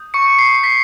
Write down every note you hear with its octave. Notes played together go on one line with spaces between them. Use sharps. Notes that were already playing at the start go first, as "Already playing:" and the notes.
Already playing: D#6 G6
C#6 C#7
C7
B6